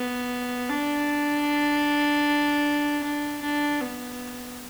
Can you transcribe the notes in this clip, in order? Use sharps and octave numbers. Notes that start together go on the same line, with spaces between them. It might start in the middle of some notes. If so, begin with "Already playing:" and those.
Already playing: B3
D4
D4
D4
B3